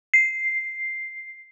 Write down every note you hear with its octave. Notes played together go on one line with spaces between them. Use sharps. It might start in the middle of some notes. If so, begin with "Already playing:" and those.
C7